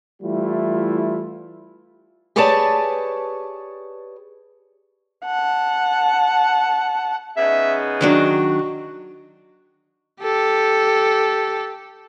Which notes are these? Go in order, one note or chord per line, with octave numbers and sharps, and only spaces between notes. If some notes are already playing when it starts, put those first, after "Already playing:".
E3 G3 A3 E4 F4
G4 G#4 B4 C#5 D5 A5
F#5 A5
C#3 B3 D#4 E5
D#3 F#3 D4 F#4
G4 A4